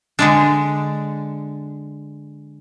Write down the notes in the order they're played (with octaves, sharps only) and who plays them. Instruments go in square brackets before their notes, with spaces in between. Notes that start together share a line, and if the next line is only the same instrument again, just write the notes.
[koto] D3 G#3 D4